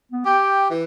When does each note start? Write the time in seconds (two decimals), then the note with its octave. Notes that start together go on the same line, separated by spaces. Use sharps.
0.12 B3
0.25 G4 G5
0.70 E3